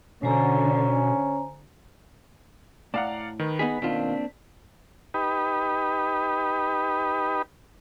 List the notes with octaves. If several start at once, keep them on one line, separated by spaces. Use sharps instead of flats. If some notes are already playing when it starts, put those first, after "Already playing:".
B2 D3 C#4 C5 G#5 A#5
A2 D5 F5 F#5 A5 A#5
D#3 B4
B3 D#4 G#4 B6
B2 D#3 A#3 C4 D4 F4
D#4 G4 B4